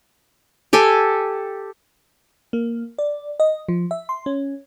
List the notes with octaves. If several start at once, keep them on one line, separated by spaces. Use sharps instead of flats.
G4 A4 G5 G#5
A#3
D5
D#5
F3
E5
C6
C#4